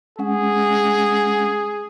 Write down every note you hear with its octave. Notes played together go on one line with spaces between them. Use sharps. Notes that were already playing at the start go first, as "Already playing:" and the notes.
G#3 C#4 G#4 F#5